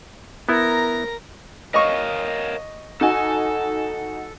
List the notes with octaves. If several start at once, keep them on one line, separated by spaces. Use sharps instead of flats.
B3 E4 A#4 A#5
A#4 C#5 D#5 F5 C#6
D#4 F#4 A4 G#5